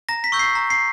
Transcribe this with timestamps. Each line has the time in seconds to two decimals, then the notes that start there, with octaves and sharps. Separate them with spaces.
0.09 A#5 A#6
0.24 B6
0.32 C#6 E6 G6
0.39 C7
0.55 A#5
0.70 C7